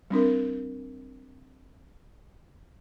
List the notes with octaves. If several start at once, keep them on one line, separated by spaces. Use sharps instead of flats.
G3 C4 D4 A#4